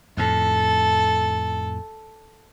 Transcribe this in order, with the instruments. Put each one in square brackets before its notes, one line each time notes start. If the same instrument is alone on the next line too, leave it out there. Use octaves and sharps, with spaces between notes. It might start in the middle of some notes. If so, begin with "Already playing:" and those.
[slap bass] F2 A2 [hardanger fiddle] A4